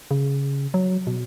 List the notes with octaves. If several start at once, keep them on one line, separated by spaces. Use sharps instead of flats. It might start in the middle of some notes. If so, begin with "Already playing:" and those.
C#3
F#3
B2